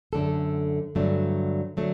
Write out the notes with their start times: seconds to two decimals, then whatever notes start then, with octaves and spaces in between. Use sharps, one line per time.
0.13 F#2 D3 A3 D4 A4
0.95 G2 D3 F#3 A3 D4
1.77 D3 F#3 A3 D4